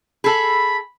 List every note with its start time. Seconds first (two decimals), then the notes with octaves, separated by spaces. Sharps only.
0.24 G#4 A4 B5